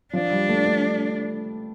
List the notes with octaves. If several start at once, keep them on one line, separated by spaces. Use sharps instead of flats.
F3 D4
G3
A3
A3